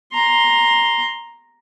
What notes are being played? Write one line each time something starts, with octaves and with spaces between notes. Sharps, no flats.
A#5 C6